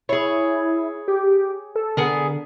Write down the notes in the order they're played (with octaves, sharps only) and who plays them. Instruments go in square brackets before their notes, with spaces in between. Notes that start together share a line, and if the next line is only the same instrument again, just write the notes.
[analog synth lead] E4 [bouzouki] G#4 C#5
[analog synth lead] G4
A4
[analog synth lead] D3 [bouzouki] B3 G#4 A#4